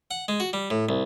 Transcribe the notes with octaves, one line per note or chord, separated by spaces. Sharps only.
F#5
G#3
F#4
G3
A2
C2